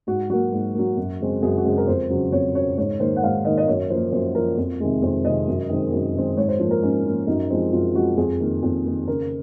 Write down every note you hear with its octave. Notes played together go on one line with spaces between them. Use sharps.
G#2 F#4
F#3 A#3 F#4
G#2
F#3 A#3
F#2
C#3 G#3 C4
F#2 G#4
F#4
C#3 G#3 C4 G#4
A#4
F2 C5
C#3 F#3 C4
F2 C#5
C#3 F#3 C4 C#5
G#2 C#5
D#3 A#3 C5
F#5
G#2 F5
D#3 A#3 D#5
D#5
F#2 C#5
F3 A#3 C5
F#2 C5
F3 A#3 A#4
F2
C3 D#3 G#3
F2 C5
C3 D#3 G#3 D#5
F#2
D#3 G#3 C4
F#2
D#3 G#3 C4
G#2 C#5
C5
F3
A#3
A#4
G#2 C#4
F3 A#3
F#2 D#4
F3 G#3 C4
F#2 F4
F3 G#3 C4 F#4
F2 G#4
D#3 A#3
F2
D#3 A#3
C#3 A#4